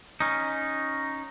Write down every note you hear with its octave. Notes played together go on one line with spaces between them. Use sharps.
C#4 D#4